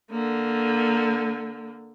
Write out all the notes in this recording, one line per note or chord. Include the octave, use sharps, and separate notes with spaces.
D3 A#3